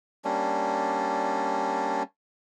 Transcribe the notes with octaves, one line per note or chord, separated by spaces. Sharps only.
G3 A#3 C#4 D4